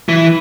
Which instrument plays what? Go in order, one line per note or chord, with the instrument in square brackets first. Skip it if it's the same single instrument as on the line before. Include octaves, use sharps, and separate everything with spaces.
[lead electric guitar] E3